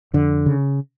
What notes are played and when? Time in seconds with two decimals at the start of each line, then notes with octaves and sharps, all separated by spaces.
0.13 F2 D3
0.46 C#3